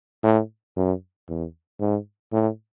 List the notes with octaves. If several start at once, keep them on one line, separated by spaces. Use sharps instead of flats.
A2
F#2
E2
G#2
A2